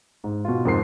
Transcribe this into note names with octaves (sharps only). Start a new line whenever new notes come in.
G#2
B2 F4
F2 G#2 A#4 C6 C7